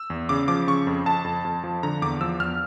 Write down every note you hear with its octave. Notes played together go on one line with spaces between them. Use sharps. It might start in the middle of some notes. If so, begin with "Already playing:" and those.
Already playing: E6
E2
C#3 D6
F3 D6
C#3 C#6
F2
F2 A5
F2
F2
F3
D3 A#5
E2 D6
F3 E6
E2 F6